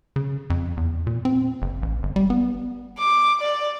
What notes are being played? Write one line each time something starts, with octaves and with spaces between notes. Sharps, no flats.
C#3
F2
E2
A#2
C4
F#1
A1
G1
G3
B3
D6
D5